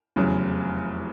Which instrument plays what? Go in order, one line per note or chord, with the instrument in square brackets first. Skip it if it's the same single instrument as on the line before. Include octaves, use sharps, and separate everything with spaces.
[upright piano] F1 E2 C#3 F#3